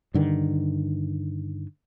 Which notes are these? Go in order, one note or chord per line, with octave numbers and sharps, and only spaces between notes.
G2 D3 D#3